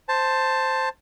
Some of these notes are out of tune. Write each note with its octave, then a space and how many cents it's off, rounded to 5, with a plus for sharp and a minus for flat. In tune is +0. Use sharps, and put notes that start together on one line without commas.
C5 +0 A5 +10